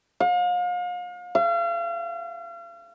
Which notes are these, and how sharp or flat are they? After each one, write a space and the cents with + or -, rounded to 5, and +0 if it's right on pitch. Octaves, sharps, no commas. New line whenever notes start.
F5 +40
F5 -40